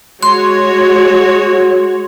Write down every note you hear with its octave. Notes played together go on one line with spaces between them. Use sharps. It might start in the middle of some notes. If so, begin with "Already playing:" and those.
G#3 F#4 C#5 C6